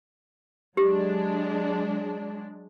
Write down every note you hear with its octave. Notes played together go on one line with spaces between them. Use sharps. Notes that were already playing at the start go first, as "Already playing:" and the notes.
F#3 G#3 D4 G4